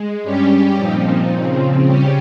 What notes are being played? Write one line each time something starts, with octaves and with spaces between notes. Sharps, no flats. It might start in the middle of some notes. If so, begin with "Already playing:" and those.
Already playing: G#3
G2 G3 C#4 G4
A#2 F3 C4 D#4
C#3 F3 C4
C#3 G3 C#4 G4